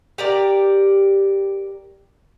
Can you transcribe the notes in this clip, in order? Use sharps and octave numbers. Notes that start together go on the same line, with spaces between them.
G4 A#4 D5